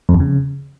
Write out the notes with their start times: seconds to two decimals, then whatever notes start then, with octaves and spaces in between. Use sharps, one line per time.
0.09 F2
0.14 E2
0.20 C#3